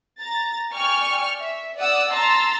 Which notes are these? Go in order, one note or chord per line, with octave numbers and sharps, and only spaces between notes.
A#5 A6
D5 G5 G#5 C#6 F6
E5
D5 F#5 D#6 E6
A5 A#5 C6 E6 A6